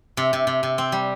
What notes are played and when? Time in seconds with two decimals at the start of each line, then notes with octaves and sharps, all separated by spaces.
0.17 C3
0.33 C3
0.47 C3
0.63 C3
0.78 C4
0.92 G3